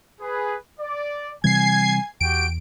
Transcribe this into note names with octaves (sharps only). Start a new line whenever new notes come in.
G#4 B4
D5
C3 E3 G3 G#5 G#6 C7
E2 F#4 G4 G5 D7